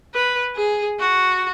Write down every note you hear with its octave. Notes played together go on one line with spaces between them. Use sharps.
B4
G#4
F#4